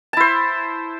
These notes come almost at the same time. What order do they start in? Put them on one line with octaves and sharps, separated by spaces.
A5 E4 C5